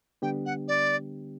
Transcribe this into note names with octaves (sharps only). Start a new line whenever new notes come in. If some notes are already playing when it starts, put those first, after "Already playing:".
D3 G3 B3 D4 G4 G5
F#5
D5